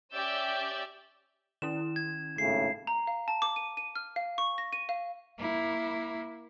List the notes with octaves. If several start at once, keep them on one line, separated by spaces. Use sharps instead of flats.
C#4 G4 D5 E5 E6 G6
D#3 C#4 E4 E7
G#6
G#1 A2 C#3 C7
A#5
F5
A5
D6
D#7
D#7
F6
F5
C#6
A#6
D#7
F5
A#3 E4